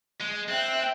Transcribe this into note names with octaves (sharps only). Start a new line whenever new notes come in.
G#3
C4 E5 G5 F#6